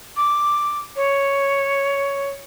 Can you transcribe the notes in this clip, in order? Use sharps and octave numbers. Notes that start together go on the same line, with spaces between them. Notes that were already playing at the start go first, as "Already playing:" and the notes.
D6
C#5